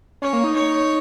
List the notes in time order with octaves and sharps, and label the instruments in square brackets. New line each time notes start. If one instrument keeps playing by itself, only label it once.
[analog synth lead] C#4 [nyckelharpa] C#5
[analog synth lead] A#3
D#4
[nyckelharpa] C#5